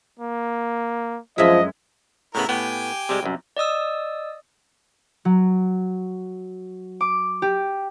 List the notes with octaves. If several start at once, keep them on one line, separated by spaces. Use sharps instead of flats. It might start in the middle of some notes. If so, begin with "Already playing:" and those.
A#3
F#2 F3 G#3 D#5 E5
A2 C#3 B3 E4 A#4
A2 B3 G4 G5 G#5
C3 G3 G#3
C2 F#2
D5 D#5 D#6 E6
F#3
D6
G4